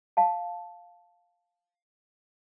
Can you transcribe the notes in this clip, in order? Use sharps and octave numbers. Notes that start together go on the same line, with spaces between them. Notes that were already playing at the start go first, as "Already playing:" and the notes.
F5 A5